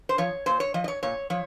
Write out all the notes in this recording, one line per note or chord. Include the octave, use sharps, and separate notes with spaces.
C5
F3 C#5
A#2 C5
C#5
F3 D#5
D#5
C#5
A#2 C#5
F3 C#5